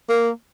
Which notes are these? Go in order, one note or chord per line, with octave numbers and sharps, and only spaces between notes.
A#3